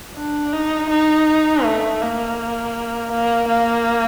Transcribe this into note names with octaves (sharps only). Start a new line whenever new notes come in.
D4
D#4
D#4
A3
A#3
A#3
A#3